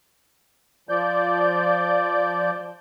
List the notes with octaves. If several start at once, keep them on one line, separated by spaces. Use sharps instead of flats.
F3 D5 G6